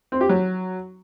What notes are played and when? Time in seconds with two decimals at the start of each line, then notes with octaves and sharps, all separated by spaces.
0.12 C4
0.21 G4
0.29 F#3